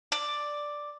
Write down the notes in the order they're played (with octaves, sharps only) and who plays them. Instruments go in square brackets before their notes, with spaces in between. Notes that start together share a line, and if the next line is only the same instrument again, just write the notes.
[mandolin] D5